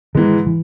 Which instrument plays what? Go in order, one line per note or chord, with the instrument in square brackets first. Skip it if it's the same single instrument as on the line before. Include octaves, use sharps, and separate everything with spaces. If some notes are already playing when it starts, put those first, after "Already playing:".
[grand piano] G#2 E3 G#3 [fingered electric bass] D#3
[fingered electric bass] E3